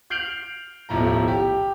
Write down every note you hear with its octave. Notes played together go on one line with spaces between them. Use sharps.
F6 G6 C7 D7 F7 F#7
D#1 B1 A2 F3 A#5
G4